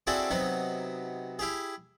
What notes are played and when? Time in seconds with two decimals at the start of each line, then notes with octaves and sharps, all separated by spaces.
0.07 C4 D4 E4 F#4 G#4 A4
0.31 C3 F#3 B3 D#4
1.39 E4 G4 G#4